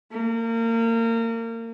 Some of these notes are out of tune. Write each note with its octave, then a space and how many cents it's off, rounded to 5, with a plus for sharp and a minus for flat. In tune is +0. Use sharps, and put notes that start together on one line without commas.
A#3 -30